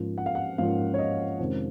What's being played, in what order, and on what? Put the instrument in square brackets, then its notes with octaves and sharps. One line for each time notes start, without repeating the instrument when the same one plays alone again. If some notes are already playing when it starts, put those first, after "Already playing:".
Already playing: [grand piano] G#2 F3 A#3 C#4 F4
F#5
F5
F#5
G#2 F3 A#3 C#4 F4 F5
C#5
D#5
F2 C3 D#3 G#3 C#4